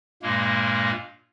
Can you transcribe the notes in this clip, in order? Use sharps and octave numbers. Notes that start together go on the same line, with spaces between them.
G2 A#2 G#3 A#3